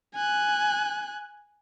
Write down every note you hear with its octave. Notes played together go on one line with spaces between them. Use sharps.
G#5 F#6